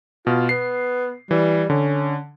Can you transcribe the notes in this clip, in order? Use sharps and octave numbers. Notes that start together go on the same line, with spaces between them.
B2 F4
B3 C7
E3 G3
D3 C#4